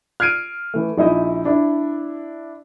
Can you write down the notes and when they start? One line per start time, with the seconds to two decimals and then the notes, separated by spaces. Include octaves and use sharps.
0.20 F6 G#6 C7 D7 D#7
0.74 E3 A3
0.98 A#1 D#4 E4 D#5
1.45 D4 E4